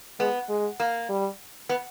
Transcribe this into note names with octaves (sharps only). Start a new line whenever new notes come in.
G#3 B3
G#3
A#3
G3
B3